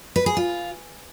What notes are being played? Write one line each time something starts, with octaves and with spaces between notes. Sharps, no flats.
B4
G#4
F4